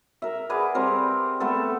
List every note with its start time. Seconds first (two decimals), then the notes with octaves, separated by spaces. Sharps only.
0.22 A#4 E5
0.50 G#4 B4 D5 F#5
0.75 G3 C4 A#4
1.40 A3 B3 A4